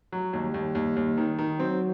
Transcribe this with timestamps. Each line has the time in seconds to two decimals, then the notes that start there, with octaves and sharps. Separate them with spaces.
0.12 F#3
0.33 D#2 G3
0.54 D#2
0.75 D#2
0.96 D#2
1.18 D#3
1.39 D#3
1.59 F#3 C4